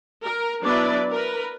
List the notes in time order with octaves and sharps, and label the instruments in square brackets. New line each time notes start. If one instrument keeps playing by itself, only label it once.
[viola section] A#4
F#3 B3 D4 E4 B4 D5
A#4 B4